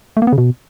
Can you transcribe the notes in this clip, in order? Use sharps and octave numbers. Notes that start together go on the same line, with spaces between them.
A3
A#3
B3
C#3
B2